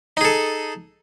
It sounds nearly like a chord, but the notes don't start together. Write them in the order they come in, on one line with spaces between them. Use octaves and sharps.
D#4 G#4 A4